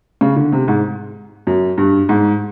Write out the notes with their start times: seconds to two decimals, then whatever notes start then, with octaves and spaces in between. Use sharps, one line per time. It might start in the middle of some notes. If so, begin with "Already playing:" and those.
0.21 C#3
0.36 D3
0.52 C3
0.68 G#2
1.47 F#2
1.78 G2
2.09 G#2